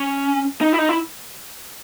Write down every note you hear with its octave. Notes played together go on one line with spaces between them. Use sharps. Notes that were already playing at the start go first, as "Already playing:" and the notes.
Already playing: C#4
D#4
E4
D#4
E4